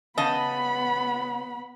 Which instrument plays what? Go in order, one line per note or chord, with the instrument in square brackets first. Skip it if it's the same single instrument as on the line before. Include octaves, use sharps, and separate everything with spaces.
[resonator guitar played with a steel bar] C#3 D#5 A5 [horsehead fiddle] B3 B5